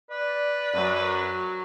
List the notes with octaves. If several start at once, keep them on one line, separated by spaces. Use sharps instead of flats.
B4 D5
F#2 F#3